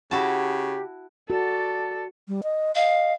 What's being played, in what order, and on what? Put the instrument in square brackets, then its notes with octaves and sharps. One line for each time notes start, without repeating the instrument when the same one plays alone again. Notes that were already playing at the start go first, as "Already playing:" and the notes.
[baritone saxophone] C#3 [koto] E4 F#4 A5 [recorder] G4
[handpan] F#4 [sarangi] A4 [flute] D5
[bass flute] G3
D#5
[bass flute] D#5 [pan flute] F5